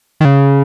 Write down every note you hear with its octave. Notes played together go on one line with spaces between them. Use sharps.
D#3
C#3